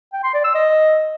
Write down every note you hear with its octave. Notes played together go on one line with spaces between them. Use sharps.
G5
C6
D5
E6
D#5